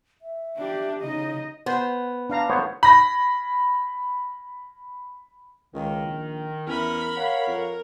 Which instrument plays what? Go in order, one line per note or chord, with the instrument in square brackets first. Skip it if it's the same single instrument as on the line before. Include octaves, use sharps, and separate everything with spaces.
[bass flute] E5
[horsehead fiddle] D4 G4
[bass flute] C#3 [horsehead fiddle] D#4 D#5
[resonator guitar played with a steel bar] B3 [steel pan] C5
[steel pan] D4 F5 A#5
[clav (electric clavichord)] B3 C5 C#5
[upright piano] B5 A#6
[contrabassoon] C#2 [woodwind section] D#3
[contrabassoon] A#1
[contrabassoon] E2 [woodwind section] E3 C#4 [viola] A#4 B5
[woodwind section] C#5 F5 F#5
[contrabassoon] F2 [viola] A#4